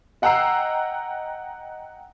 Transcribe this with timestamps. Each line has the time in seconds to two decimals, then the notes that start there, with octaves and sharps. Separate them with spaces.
0.22 D#5 F#5 G5 A#5 E6 C7